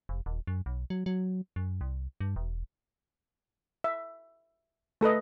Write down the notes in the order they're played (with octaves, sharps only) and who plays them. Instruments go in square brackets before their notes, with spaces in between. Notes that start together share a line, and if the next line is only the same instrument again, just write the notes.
[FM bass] F1
D#1
F#2
B1
F#3
F#3
F#2
C2
G2
E1
[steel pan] E5
A3 A4 B4 D#5